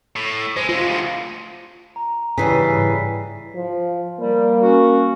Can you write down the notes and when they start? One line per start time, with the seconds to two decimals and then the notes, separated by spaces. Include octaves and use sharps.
0.16 A2
0.57 G#3 C5
0.69 C3 G#3 F4
0.87 D2 A2
1.96 A#5
2.38 G#2 C#3 E3 G3 G#5 B6 C7
3.56 F3
4.19 G3 A#3
4.62 C#4 F#4